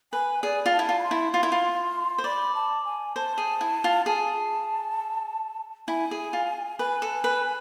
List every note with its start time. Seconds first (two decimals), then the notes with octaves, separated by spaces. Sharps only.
0.13 B4 G#5
0.43 G#4 D5
0.66 F4
0.73 A5
0.79 E4
0.89 F4
0.99 B5
1.03 C6
1.11 E4
1.33 F4 C6
1.43 E4
1.52 F4
2.18 C5
2.24 D5 B5
2.55 A5
2.85 G#5
3.16 C5 A5
3.38 G#4
3.61 E4
3.84 F4
4.06 G#4 A5
5.88 E4 G#5
6.11 G#4
6.33 F4
6.79 B4 G#5
7.02 A4
7.24 B4